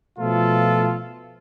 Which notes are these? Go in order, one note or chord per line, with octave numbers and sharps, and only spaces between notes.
B2 F3 A3 F4 A4